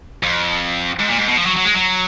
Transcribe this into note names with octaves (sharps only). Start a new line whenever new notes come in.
F2
G#2
A#2
G#2
B2
F3
F#3
F#3
G#3
F#3